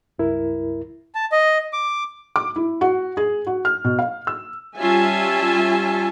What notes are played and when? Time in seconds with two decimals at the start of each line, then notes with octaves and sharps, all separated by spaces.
0.19 C#2 G2 E4 A#4
1.15 A5
1.32 D#5
1.73 D6
2.36 D6
2.56 E4
2.81 F#4
3.17 G#4
3.47 F#4
3.65 F6
3.85 B2
3.99 F5
4.27 E6
4.78 G3 C#4 F4 E5 G#5 A5